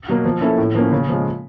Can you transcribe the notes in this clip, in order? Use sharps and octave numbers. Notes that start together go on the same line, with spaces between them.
B2 F#3 A#3
F3
A#3 C#4 E4 A4
A2
F3 A#3 C#4
C#3
F3 G#3